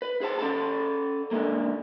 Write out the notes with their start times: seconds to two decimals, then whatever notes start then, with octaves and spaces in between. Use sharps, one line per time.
0.02 B4
0.21 G#4 C5 A5
0.39 C#4 A4 A5
1.31 D3 G#3 A#3